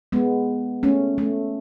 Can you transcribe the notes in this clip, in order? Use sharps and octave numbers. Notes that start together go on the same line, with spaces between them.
G#3 B3
A3 C#4
A3